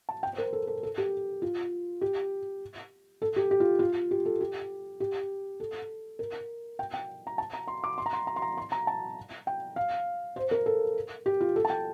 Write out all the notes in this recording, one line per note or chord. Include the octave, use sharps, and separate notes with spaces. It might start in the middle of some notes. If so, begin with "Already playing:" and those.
A5
G5
C5
A#4
A4
A4
A4
G4
F4
G4
A4
G4
G4
F4
F4
G4
A4
G4
G4
A4
A#4
G5
G5
A#5
A5
A#5
C6
D6
C6
A#5
C6
A#5
C6
A#5
C6
A#5
A5
G5
F5
C5
A#4
A4
G4
F4
A4
A5
G5